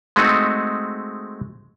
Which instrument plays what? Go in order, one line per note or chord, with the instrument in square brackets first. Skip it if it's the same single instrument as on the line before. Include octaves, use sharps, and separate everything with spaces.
[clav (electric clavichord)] G#3 A3 C4 D#4 F#4